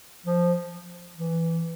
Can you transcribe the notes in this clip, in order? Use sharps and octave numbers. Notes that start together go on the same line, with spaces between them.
F3
E3